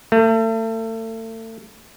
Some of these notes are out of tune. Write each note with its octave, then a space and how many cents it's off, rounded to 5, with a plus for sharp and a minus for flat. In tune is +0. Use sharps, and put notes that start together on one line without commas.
A3 +35